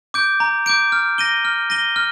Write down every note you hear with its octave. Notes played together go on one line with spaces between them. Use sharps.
D6 G6 D7
A#5
D6 G6 D7
F6
A#6 D#7 G7
F6
A#6 D#7 G7
F6